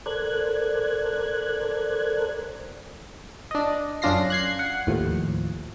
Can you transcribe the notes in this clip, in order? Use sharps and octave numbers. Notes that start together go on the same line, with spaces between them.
A4 A#4 C5 D5 F#6 G#6
D4 D#5
F#2 C#4 D4 F4 A#6 C7
F#6 G#6 C7
F#5
D#2 A2 F3